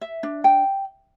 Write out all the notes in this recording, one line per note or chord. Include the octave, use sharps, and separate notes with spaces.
E5
D4
G5